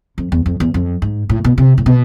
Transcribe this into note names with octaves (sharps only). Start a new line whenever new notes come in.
F2
E2
F2
E2
F2
G#2
A2
B2
C3
A2
B2